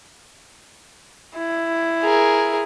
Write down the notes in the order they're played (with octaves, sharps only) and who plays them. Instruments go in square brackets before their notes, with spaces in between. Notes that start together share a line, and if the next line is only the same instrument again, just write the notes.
[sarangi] E4
[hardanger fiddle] G#4 A#4